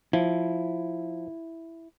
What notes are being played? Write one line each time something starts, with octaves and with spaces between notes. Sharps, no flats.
F3 E4